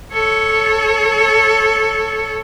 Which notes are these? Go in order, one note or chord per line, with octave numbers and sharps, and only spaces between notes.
A4 C#5